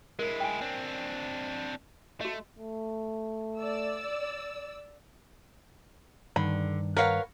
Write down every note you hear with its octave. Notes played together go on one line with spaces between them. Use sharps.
G#3 E4 A#4
G5 G#5
C4 D4
A3 F#4 D#5
A3
D5 E6
G2 D3 D#3 B5
A#4 B4 C#5 F5 F#5